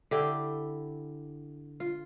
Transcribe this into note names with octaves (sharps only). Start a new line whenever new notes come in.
D3 E4 G4
F4